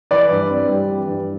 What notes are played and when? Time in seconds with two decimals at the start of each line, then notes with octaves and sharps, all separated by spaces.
0.11 E3 B4 D5
0.31 G2
0.50 C4
0.69 G3
0.88 E3
1.08 G2